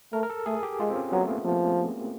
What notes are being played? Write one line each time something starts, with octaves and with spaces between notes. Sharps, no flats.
A3 A#4
A#4
A4
A3 G#4
G4
G#3 F4
C4
C#4
F#3 B3
A3
A#3
F3